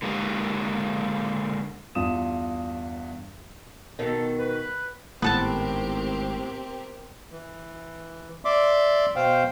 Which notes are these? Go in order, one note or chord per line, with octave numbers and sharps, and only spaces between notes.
D3 G#3 A#3 G4 B4
E2 G2 F4 D#6 E7
B2 D#3 A4
B4
G#1 A2 B3 C4 G4 A4 A#4 A5
E3
D5 E5 C6 D6
B2 C5 F5 G5